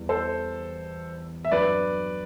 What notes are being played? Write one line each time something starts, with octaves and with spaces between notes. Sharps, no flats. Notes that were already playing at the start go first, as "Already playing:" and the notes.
Already playing: E2 G3
A4 C5
E5
G2 F#3 A3 D4 B4 D5